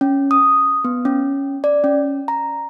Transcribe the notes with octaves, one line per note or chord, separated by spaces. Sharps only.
C#4
D#6
B3
C#4
D5
C#4
A#5